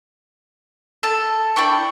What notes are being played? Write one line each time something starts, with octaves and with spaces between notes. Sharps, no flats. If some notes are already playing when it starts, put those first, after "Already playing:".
A4 A5
D4 E4 G5 C#6